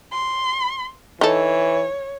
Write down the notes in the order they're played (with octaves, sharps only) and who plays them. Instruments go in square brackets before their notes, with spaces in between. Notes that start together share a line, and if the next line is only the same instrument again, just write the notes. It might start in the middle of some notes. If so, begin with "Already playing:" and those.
[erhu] C6
[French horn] E3 [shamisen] D#4 A4 [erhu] C#5